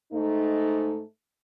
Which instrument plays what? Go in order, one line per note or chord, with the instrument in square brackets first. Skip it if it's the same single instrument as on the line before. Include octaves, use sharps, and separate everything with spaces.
[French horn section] G#2 A3 D#4